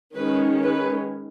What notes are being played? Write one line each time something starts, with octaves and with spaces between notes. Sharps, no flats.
D#3 G#3 C#4 B4
B4